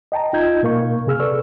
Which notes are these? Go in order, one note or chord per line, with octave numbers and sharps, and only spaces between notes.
D#5 G5 A5 A#5
D#4 F4 D#5 G6 G#6
B2 A#3 A#4 F5 C#6
C3 G#4 E6 F6
A4 B4 D5 C#6 E6